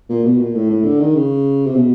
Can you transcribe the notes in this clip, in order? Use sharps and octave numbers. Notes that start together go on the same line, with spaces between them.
A#2
B2
A#2
A2
A2
D3
D#3
C#3
C3
B2